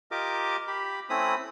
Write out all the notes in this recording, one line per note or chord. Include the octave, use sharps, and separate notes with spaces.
F4 G4 A#4 D#5 D6
G4 B5
A3 C4 C#4 E4 B5 D#6